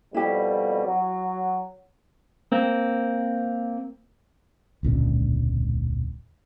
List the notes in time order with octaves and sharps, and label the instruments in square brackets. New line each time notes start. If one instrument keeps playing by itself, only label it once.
[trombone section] F2 B2 G3 [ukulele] E4 G4
[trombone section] F#3
[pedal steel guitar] A#3 C4
[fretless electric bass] E1 C#2 A#2 D3